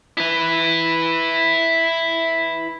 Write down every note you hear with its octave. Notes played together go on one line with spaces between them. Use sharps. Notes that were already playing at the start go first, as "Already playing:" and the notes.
E4 B4